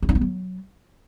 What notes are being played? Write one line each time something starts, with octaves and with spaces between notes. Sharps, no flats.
E4
D#4
B3
F#3